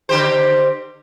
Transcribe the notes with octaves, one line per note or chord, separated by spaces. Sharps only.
D3 G4 C5